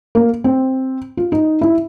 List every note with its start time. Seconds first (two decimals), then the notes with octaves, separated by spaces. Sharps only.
0.15 A#3
0.44 C4
1.17 F4
1.32 D#4
1.61 E4